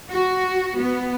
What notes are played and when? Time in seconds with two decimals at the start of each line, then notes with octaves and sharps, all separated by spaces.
0.11 F#4
0.79 B3